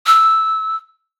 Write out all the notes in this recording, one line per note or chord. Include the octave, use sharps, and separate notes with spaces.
E6